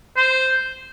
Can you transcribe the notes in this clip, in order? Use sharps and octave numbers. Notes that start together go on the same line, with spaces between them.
C5